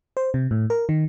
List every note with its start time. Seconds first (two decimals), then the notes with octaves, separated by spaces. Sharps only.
0.17 C5
0.34 C3
0.51 A2
0.70 A#4
0.89 D#3